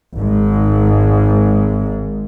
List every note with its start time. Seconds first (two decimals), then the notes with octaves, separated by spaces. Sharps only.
0.14 G#1 G#2